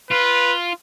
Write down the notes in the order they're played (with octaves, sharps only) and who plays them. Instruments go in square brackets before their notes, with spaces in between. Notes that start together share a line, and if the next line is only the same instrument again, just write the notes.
[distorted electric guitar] F4 [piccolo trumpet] B4